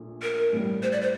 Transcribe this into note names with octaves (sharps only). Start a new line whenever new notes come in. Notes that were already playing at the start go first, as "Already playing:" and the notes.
Already playing: A#1 A#2 A3
A#4
A1 A2 G3
C5
D5
C5